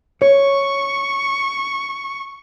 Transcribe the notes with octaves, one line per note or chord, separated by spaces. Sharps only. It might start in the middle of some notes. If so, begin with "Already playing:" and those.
C#5 C#6